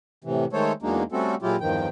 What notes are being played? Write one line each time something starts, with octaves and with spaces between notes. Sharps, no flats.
A2 C3 E3
D#3 G#3 A3 A4 C5 C#5
E2 F#3 G#3 A#3 D4 D#4
G3 A3 C4 C#4 F#4 A4
A#2 F#3 G#3 E4 F4 G4
E2 G2 D#3 F3 G5